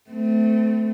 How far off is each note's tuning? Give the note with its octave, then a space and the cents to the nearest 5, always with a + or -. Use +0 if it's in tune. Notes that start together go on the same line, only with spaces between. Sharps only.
A3 +0 C4 -35